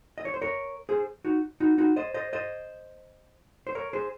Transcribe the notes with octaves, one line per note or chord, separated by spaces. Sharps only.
D#5
C#5
C5
A#4 C#5
G#4 C5
D#4 F#4
D#4 F#4
D#4 F#4
C5 D#5
C5 D#5
C5 D#5
C5
A#4 C#5
G#4 C5